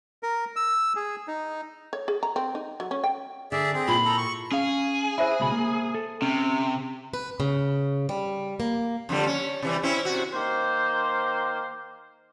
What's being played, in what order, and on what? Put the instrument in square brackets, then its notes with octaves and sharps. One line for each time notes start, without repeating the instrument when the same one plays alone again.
[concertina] A#4
E6
G#4
D#4
[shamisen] C#5
G#4
A#5
C4
D#4
F#3
C#4
G5
[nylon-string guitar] D3 [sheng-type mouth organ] G#4 D5 E5
[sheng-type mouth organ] C4 G#4
[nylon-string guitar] A#2 E4 F4 [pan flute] B5
[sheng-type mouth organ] A4 A#5
C#6
[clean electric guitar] C#4 F5 [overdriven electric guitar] G#4
[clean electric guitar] E4 [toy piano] C5 E5 G#5
[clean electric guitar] C#2 B2 B5
A#3
A4
[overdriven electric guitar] C3 [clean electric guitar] C#4
[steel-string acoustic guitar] B4
C#3
G3
A#3
[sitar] F2 D3 G3
C#4
C3 E3 G3
C4 C#4 E4
C3 F#4
[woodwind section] D#3 A#3 C5